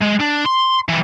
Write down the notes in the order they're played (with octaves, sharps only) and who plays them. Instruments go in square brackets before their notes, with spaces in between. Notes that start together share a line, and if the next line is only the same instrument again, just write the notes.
[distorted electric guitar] G#3
D4
C6
E3 G3